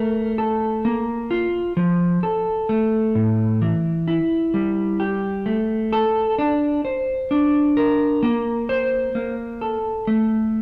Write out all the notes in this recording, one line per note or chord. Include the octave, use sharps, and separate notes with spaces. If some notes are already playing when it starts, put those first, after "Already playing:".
Already playing: A3 A#4
A4
A#3
F4
F3
A4
A3
A2
E3
E4
G3
G4
A3
A4
D4
C5
D4
A#4
A#3
C5
A#3
A4
A3